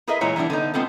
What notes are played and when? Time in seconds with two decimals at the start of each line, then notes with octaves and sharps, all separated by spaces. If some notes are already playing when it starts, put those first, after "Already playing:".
0.07 E4 G#4 A#4 B4 D#5 E5
0.21 A#2 E3 G#3 E4 C#5 A#5
0.36 E3 G3 B3 D4 E4
0.50 D3 B3 D#4
0.74 G#3 B3 C4 F4 A4